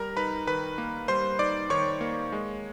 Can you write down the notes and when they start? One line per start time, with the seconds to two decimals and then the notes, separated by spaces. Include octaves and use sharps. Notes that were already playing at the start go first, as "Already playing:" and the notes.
Already playing: G3 A#4 A#5
0.17 D#4 B4 B5
0.47 D#3 B4 B5
0.78 A#3
1.08 G3 C5 C6
1.39 D#4 D5 D6
1.70 D#3 C#5 C#6
2.01 A#3
2.32 G#3